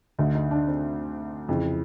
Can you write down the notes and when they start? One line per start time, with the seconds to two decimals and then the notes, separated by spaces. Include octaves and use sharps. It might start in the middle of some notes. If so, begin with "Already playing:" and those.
0.18 D2 D3 D#4
0.35 D#4
0.51 D4
0.67 C4
1.49 F2 C#3 E3